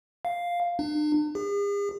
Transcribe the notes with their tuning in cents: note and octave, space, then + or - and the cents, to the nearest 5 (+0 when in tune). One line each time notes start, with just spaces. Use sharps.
F5 +0
D4 +45
G#4 -45